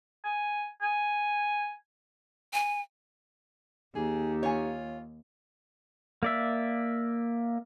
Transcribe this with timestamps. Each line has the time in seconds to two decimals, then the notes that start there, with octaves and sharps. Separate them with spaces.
0.24 G#5
0.82 G#5
2.53 G#5
3.96 D#2 D#4 G4 G#4
4.43 F4 C#5 G#5
6.23 A#3 D5 E5